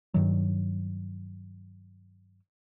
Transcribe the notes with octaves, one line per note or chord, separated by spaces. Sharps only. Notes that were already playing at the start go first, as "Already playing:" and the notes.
G2 D#3 F#3